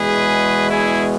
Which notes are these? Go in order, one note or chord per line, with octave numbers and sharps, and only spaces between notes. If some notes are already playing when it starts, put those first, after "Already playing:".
Already playing: E2 B2 G#3 G#4 B4
E4 G#4